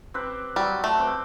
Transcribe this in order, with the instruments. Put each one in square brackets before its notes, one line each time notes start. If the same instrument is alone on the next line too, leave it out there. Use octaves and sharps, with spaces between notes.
[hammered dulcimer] C4 G4 B4
[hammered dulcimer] F#3 [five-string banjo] G3
[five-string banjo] A3
[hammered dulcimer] C4 G4 B4